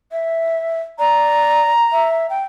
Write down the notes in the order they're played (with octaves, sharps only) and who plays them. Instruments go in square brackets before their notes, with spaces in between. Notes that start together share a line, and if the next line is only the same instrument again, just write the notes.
[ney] E5
[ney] D5 [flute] A#5
[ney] E5
G5